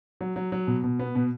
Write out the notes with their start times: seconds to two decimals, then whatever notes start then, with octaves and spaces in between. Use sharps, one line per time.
0.21 F#3
0.36 F#3
0.52 F#3
0.67 B2
0.84 B2
0.99 B3
1.15 B2